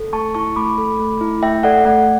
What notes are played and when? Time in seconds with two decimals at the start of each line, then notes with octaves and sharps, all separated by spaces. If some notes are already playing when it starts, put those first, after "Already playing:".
Already playing: A4
0.13 A3 A5 C#6
0.35 E4 A5 C#6
0.56 A3 B5 D6
0.78 A4
1.00 A3
1.21 E4
1.42 A3 E5 G5
1.63 A4 D5 F#5
1.85 A3 D5 F#5